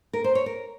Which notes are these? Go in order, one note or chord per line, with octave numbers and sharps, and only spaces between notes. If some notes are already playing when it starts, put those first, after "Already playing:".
A#4
C5
C#5
A#4